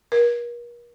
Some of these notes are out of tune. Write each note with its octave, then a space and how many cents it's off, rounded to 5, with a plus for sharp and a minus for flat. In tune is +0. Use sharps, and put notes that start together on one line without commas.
A#4 +40